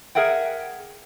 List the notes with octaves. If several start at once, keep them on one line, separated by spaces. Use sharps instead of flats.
G#4 A#4 E5 F#5 G5